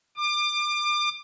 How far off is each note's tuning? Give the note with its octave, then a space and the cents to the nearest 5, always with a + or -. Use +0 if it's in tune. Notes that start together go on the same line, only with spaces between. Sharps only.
D6 +30